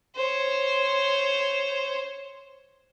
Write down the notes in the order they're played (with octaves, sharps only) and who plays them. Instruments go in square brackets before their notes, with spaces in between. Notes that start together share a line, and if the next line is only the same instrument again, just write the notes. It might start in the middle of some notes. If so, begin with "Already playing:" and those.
[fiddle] C5 C#5